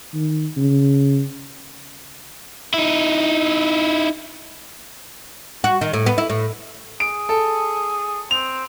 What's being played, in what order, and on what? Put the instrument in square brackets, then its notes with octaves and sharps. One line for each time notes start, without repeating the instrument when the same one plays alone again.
[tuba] D#3
C#3
[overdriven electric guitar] D#4 E4
[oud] F#4
D#3
A2
B3
E4
A2
[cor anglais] G#4 [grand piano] D7
[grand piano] A4
[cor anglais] C4 [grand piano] F7